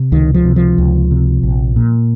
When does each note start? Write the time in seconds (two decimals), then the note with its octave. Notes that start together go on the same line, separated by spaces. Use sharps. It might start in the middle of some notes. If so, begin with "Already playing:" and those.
Already playing: C3
0.12 C#2 D#3
0.34 F3
0.44 C3
0.56 F3
0.78 C#2
1.11 C3
1.43 A#1
1.76 A#2